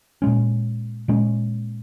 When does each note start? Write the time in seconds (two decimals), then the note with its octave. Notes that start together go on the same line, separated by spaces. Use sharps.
0.22 A#2 G#3 C#4
1.08 A#2 G#3 C#4